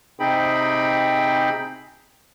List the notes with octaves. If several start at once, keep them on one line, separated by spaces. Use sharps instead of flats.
C3 C4 D#4 G#4 G5 B5